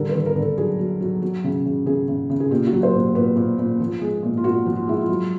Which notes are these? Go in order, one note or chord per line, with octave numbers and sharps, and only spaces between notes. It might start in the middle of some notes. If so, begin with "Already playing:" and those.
Already playing: D3 G3 A#4
B4
D3
A#4
D3
A4
F#3 G#4
F#3
F#3
F#3
C#3
C#3
C#3 G#4
C#3
C#3
G#4
A#2 G4
F#4
F#3
C5
A#2
A#2 B4
A#2
A#2
F3
G#3
A#2
F4
A#2 F#4
F3
F4
G#3 E4
F4
F#3